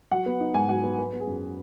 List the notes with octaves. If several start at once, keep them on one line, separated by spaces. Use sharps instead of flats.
F#3 F#5
B3
D#4
G#2 G#5
F#3 F#5
B3
F#3 B4
B3
G#4
F#2